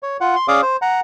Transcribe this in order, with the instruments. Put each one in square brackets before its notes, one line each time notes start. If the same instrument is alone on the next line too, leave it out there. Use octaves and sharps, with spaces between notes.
[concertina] C#5
F4 F#5
C6
C#4 G#4 D5 F5 D6 D#6
C5
F#5 A#5